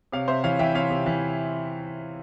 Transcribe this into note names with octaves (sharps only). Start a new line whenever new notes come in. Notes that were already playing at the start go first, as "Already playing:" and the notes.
C3 C#5 F5
C3 C5 E5
E3 C#5 F5
E3 E5 G5
C3 C#5 F5
C3
E3